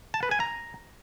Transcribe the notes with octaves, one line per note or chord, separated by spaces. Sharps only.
A5
B4
G#5
A#5